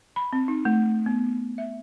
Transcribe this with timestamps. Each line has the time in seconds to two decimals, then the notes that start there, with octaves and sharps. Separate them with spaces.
0.16 B5
0.33 C4
0.48 D#4
0.65 A3
1.06 B3
1.58 E5